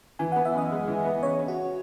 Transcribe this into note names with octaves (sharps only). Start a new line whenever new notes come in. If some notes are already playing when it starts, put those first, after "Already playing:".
E3 G#5
B3 F#5
E5
F#2 D#5
G#3
E3
B3
C#3 C#5
C#4
F#4